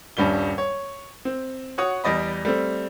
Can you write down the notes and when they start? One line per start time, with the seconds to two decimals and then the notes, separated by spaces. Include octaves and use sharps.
0.17 D#1 G2 G3 C#4 G7
0.58 C#5
1.25 C4
1.78 F#4 C#5 F#5 D#6
2.04 E2 G3 D5 D#5 B5
2.45 G3 A3 C4